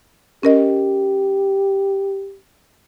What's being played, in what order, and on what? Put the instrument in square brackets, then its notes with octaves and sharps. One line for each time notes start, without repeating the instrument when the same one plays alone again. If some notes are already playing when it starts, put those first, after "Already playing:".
[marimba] C#4 A#4 D#5 [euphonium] G4